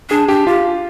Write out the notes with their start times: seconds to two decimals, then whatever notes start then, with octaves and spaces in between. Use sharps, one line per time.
0.10 D4 G#4
0.28 D4 G4
0.47 F4 G4